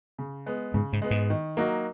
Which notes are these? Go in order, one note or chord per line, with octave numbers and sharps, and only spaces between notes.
C#3
G#3 B3
G#2 C#3
G#2
G#3 B3
G#2
D#3
F#3 A#3 D#4 F#4